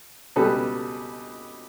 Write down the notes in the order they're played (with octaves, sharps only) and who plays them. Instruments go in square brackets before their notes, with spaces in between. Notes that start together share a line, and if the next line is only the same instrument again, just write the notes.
[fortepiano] C#2 B2 G3 A4 B4